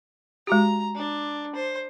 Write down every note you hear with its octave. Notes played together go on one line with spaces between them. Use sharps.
G#3 F#4 G4 A#5
D4
C5